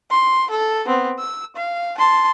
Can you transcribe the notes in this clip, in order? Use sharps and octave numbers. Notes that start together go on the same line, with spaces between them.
C6
A4
B3 C4
E6
F5
A5 C6